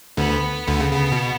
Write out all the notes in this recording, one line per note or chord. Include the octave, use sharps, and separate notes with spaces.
D2 D3 B3
D2 D3
C#3
C#3 B3
B2